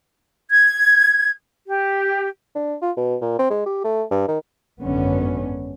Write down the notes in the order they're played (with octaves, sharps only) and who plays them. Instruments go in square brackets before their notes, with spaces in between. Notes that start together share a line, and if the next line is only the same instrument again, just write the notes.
[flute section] G#6
G4
[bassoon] D4
F4
B2
A#2
C4
G#3
G4
A3
G2
D#3
[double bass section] G#1 F#2 D3 B3 C#4